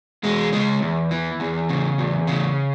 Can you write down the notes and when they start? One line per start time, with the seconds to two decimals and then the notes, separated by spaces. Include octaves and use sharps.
0.23 E2 G#3
0.52 C#3 G#3
0.82 E2
1.11 E3
1.40 E2
1.69 C#3
1.98 E2
2.27 C#3